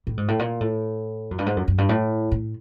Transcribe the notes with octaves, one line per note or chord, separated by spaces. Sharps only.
A2
G#2
A2
A#2
A2
F#2
G2
G#2
F#2
F#2
G2
A2
A2